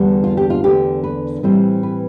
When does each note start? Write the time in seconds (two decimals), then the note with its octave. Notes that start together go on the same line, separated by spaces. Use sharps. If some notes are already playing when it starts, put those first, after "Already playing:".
Already playing: E2 D3 G3
0.24 F4
0.37 G4
0.50 F4
0.64 E2 D3 A3 G4
1.04 B4
1.43 A2 E3 G3 C4 E4 C5
1.83 B4